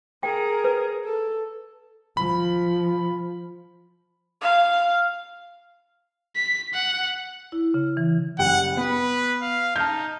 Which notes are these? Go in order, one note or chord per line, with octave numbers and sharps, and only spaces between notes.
G#4 A#4 G5
B4
A4
F3 B5
F5
B6
F#5
E4
C#3
E3
F#1 G3 F#5 G5
B3 B4
F5
D#4 A5 F6 G6